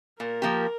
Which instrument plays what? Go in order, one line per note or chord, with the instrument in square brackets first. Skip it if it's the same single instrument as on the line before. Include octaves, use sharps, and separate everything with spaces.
[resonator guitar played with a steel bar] A#2 [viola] A#4
[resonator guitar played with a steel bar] F3 A#3 G4